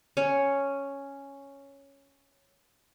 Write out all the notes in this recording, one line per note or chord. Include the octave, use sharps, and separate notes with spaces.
C#4 C#5